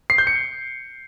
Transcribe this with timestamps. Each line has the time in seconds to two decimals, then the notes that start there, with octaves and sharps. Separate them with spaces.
0.10 C7
0.18 G6
0.27 C#7